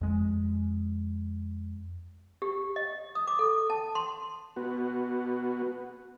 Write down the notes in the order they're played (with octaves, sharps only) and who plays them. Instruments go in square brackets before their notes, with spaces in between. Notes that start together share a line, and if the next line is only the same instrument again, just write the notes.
[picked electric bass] F2 G#3
[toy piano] G4
D#5
D#6
D6
A4
A5
C6
[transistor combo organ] B3 F#4